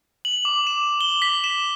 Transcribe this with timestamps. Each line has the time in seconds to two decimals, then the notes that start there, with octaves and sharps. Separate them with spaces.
0.25 F#7
0.45 D6
0.67 E7
1.01 G7
1.22 B6
1.44 E7